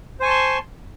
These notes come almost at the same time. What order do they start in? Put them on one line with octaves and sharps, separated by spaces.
C5 G#5 C#6 A5 C6